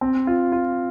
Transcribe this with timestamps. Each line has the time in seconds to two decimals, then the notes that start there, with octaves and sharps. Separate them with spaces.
0.01 C4
0.27 F4
0.52 F4